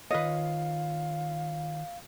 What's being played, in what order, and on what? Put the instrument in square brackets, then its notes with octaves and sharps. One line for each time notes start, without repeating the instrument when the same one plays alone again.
[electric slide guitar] D#3 F4 C#5 [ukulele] B4 D#5 [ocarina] F5